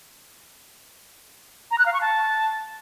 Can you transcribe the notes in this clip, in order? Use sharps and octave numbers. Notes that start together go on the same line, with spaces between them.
A#5
F#6
F5
C#6
A5